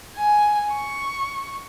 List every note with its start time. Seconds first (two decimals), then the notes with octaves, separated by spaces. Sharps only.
0.17 G#5
0.74 C#6